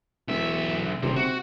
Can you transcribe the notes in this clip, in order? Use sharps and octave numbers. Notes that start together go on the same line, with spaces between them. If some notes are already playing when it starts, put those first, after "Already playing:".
E1 B1 E5
D#1 C3
C3 F#4